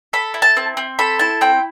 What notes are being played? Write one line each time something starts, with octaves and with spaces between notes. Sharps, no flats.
A4 B5
E4
A5
C4
C4
A4 B5
E4 A5
C4 G5